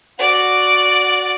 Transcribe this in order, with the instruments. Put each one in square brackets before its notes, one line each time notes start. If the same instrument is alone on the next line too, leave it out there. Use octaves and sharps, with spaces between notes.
[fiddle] F#4 D5